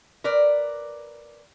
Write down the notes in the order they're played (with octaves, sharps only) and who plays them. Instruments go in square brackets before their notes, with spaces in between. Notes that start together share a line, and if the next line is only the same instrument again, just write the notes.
[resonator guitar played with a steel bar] A#4 B4 D5